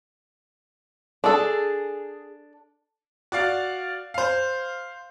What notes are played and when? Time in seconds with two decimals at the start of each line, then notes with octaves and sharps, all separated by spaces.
1.24 D4 G#4 A4
3.32 F#4 D5 F5
4.14 C5 F5